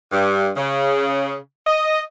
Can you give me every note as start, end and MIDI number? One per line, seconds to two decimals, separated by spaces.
0.12 0.49 43
0.57 1.35 49
1.67 2.01 75